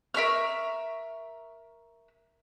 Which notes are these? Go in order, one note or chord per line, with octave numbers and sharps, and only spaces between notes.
A#4 E5 C#6 F6